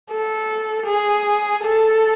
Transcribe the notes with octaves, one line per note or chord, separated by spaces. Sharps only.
A4
G#4
A4